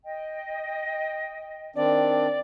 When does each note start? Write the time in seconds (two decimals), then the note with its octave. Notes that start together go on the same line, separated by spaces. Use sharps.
0.05 D#5 G5
1.76 D#3 C4 D4 D5